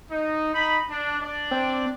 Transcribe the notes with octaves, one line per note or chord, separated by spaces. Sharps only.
D#4
D#4 B5
D4
D4 D5
C4